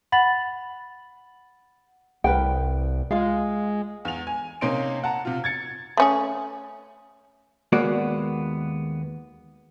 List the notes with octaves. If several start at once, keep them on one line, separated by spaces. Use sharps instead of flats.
F#5 B5 A6 F#7
C2 A#4 B4 G5
G#3 F4 F5
E2 F7
G#5
C3 A#3 C#4 D#4 C6 D7
F#5 A5 A#5
C3 F4
G#6 A6 C#7
A3 C#4 G#4
D#2 G#3 A#3 B3 F#4 D5